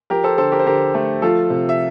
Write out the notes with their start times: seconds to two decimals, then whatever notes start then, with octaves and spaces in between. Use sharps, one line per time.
0.10 F3 G4 A#4
0.24 A4 C5
0.38 D3 A4 C5
0.52 G4 A#4
0.60 C5
0.66 D3 G4 A#4
0.94 A3
1.22 F3 F4 A4
1.50 C3
1.69 E5